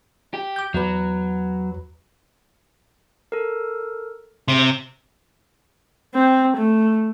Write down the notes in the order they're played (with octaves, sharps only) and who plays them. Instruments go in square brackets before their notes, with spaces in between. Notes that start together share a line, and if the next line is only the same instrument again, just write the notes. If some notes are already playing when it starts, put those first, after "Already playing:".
[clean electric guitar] G4
[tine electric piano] D6 G6
[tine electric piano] E2 B4 [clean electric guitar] F#3
[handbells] A4 A#4
[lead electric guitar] C3 [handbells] C6 D7
[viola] C4
A3